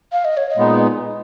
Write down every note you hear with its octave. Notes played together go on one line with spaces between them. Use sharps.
F5
D#5
C#5
D#5
A#2 G#3 B3 D#4